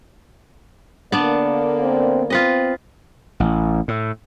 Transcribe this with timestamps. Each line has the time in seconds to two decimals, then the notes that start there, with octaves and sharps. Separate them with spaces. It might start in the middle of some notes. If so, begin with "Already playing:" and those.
1.12 D3 A#3 B3 D4 D5
1.82 C4
2.30 C4 F4 B4 D#5
3.40 A1
3.88 A2